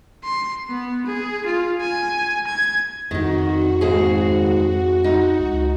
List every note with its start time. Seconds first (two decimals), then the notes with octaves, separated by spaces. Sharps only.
0.24 C6
0.69 B3
1.06 G#4
1.46 F4
1.81 G#5
2.47 G#6
3.11 F2 D#3 D#4 F#4
3.81 D#2 G#2 G#4
5.04 D#4
5.39 C#2